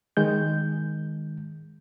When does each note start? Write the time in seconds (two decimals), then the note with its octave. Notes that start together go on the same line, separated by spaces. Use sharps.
0.17 D#3 G#3 G6